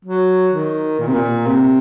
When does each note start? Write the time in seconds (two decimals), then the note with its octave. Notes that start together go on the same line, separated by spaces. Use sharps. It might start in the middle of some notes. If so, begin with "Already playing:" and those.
0.05 F#3
0.52 D#3
0.99 A#2
1.08 C3
1.14 A#2
1.46 C3